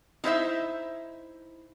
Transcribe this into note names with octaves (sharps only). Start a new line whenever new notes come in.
D#4 E4 C5 E5